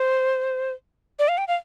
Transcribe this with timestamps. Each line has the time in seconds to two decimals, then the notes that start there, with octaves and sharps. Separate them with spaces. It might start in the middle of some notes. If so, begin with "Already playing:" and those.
Already playing: C5
1.19 D5
1.28 F5
1.38 G5
1.48 F5